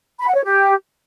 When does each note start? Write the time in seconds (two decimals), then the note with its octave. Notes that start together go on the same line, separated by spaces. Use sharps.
0.20 B5
0.28 F#5
0.36 C#5
0.44 G4